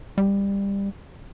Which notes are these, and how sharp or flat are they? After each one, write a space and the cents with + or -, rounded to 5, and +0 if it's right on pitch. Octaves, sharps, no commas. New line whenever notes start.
G3 +20